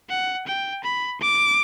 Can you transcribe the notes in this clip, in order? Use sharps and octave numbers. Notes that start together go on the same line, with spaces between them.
F#5
G5
B5
D6